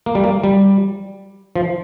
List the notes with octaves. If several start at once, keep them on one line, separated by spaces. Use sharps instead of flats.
A#3
G3
A#3
G3
F3